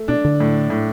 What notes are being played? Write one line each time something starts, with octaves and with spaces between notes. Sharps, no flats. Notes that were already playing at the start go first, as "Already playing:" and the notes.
Already playing: A3
B2 D4
D3
A2
A2